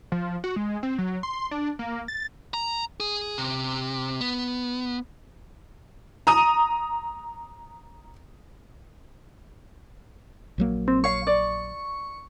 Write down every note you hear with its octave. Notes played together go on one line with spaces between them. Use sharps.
F3
F#4
G#3
C4
F#3
C6
D4
A#3
A6
A#5
G#4
C3
B3
A#5 D#6 D#7
A#1 F#3 A#3
C4
C#5 F5 C#6
D5